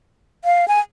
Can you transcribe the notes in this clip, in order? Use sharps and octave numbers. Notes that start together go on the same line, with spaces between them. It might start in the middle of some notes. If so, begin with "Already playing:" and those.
F5
G#5